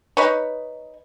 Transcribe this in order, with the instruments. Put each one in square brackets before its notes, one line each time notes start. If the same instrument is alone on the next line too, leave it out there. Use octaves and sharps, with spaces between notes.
[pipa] D#4 B4 C#5